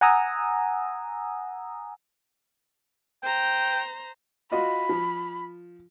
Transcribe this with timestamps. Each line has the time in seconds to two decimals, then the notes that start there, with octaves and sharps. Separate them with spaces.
0.01 F#5 G#5 A#5 D#6 E6
3.23 C5 G5 A#5
4.52 F4 F#4 D#5 B5
4.89 F3